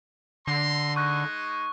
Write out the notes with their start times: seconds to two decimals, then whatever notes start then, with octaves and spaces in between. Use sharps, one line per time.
0.47 D3 A#5 C6
0.96 G#3 D#4 C#6 F#6